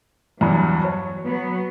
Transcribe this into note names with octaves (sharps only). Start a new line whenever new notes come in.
E2 G2 F#3
C#5
F#3 B3